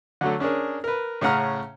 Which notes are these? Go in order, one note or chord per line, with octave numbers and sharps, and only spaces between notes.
D3 F#3 A3
C#4 D4 G#4 A#4
A#4 B4
A2 C#3 C#4 F#5 A#5 F6